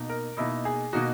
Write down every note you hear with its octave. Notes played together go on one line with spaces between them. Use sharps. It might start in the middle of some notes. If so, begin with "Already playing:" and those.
Already playing: B2 A#3 D#4
A#4
B2 A#3 D#4 E4
G#4
B2 A#3 D#4 F#4